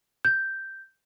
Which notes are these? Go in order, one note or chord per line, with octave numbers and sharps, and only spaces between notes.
G6